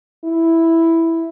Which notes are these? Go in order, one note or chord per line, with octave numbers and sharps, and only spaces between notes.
E4